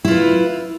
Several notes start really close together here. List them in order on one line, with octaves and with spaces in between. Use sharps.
E4 F4 B4